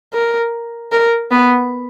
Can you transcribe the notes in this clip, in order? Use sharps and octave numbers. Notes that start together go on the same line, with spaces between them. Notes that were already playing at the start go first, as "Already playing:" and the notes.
A#4
A#4
B3